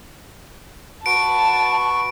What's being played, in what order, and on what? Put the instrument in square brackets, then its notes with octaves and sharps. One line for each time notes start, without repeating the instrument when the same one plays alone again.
[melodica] F#4 B4 C#6 [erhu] A5 [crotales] D7